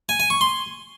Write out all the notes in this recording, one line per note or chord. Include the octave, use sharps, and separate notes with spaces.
G#5
G#5
C#6
C6